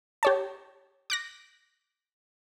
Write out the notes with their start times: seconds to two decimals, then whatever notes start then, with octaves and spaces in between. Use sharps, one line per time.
0.23 G4 C#5 A5
1.10 D6 F#6 A#6